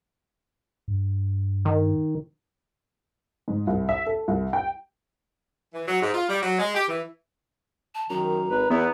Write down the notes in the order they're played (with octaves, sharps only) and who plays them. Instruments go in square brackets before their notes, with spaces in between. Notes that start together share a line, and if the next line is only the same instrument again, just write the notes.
[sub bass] G2
[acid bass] D#3
[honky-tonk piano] G#2
C2
E5
A4
C2
G5
[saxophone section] E3
F#3
G#2
F4
G3
F#3
G#3
G4
E3
[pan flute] A5
[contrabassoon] F#2 [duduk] D#3 [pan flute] A#5
[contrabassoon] G#1 [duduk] B4
[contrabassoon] E2 [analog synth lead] B3 [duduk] E4